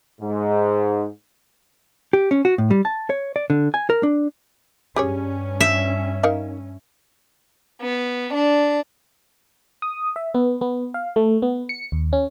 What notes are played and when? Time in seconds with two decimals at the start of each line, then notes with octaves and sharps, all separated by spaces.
0.21 G#2
2.13 G4
2.31 C#4
2.45 F#4
2.58 A2
2.71 G3
2.85 A5
3.10 C#5
3.36 D5
3.50 D3
3.74 G#5
3.90 A#4
4.03 D4
4.96 G2 C#4 G4 G#4 C#5
5.60 F3 E5
6.23 D#4 A#4 F5
7.82 B3
8.33 D4
9.82 D#6
10.16 E5
10.34 B3
10.61 B3
10.94 F5
11.16 A3
11.42 B3
11.69 C#7
11.92 D#2
12.13 C#4